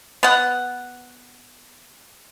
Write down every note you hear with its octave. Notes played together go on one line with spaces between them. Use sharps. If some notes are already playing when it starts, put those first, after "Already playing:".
B3 F#5